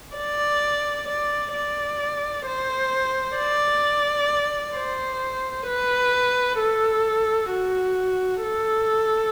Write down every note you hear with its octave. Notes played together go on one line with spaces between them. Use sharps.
D5
D5
D5
C5
D5
C5
B4
A4
F#4
A4